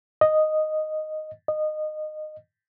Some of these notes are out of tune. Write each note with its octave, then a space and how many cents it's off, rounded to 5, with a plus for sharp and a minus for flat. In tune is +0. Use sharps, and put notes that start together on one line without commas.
D#5 -5
D#5 -20